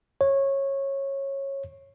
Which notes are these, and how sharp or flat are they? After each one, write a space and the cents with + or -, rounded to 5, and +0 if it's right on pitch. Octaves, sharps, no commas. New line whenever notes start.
C#5 -15